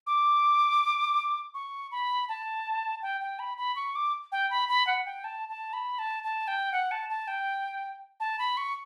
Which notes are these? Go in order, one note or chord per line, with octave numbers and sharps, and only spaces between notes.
D6
C#6
B5
A5
G5
G5
B5
B5
C#6
D6
G5
B5
B5
F#5
G5
A5
A5
B5
A5
A5
G5
F#5
A5
A5
G5
A5
B5
C#6